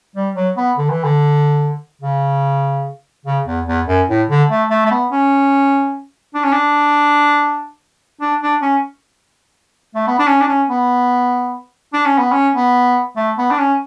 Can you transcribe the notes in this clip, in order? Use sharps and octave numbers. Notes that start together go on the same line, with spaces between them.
G3
F#3
B3
D3
E3
D3
C#3
C#3
E2
E2
F#2
A2
D3
A3
A3
A3
B3
C#4
D4
C#4
D4
D4
D4
C#4
A3
B3
D4
C#4
D4
C#4
B3
D4
C#4
B3
C#4
B3
A3
B3
D4
C#4